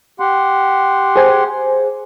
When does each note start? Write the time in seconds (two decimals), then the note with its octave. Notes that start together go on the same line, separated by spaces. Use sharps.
0.20 G4 F#5 C6
1.16 G#4 C5 G#5